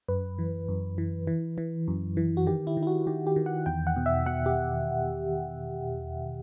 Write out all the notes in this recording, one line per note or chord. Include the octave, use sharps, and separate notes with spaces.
F#2 B4
E3
F#2
E3
E3
E3
F#2
E3
F#4
D#3 G4
E4
D#3
E4
F#4
D#3 G4
G4
D#3
F#5
E2 G5
F#5
B2
E5
B2 F#5
G4